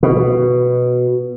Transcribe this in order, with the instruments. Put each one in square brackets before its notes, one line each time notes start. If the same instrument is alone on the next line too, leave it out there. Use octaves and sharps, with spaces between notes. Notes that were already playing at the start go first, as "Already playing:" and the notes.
[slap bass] B2